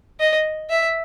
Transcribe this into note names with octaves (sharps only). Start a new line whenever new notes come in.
D#5
E5